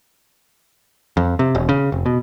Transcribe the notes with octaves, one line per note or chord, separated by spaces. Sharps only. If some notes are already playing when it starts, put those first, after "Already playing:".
F2
C3
E1
C#3
F1
B2